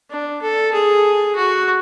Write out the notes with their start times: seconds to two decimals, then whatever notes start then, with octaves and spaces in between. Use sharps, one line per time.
0.10 D4
0.42 A4
0.73 G#4
1.36 F#4